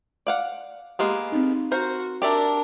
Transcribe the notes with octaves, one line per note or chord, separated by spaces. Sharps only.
D5 F5 F#5
G#3 A#3 B3 G4
C4 D#4
F#4 A#4 C5
D4 G4 A#4 D5 E5